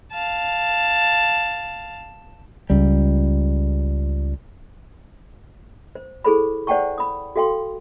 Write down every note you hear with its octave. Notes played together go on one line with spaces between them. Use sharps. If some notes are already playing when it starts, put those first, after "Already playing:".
F5 A5
C#2 G3
C5
E4 G#4 A4 C5 B5
C5 D5 F#5 G5 A5 C#6
B5 D#6
F#4 A4 F5 G5 C6